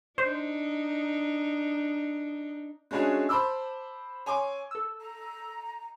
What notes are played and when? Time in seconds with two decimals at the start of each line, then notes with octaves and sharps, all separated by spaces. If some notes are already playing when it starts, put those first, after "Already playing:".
0.18 D4 D#4 C5
2.91 G#3 A3 C#4 D4 F#4 G#4
3.29 C5 A5 B5 C6 D6 E6
4.26 C#5 G#5 C6 D6
4.71 A4 E6
5.01 A#5